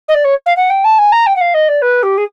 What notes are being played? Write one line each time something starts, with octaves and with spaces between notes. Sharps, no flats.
D#5
D5
C#5
F5
F#5
G5
A5
G#5
A#5
G5
F#5
F5
D#5
D5
B4
G4
G#4